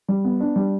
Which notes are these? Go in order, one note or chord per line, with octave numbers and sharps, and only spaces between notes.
G3
B3
D4
G3